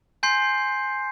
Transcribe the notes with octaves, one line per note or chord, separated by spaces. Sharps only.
G#5 C6 G6 C7